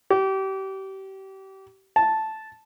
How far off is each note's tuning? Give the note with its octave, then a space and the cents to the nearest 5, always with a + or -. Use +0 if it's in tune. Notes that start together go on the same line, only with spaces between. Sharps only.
G4 -30
A5 -5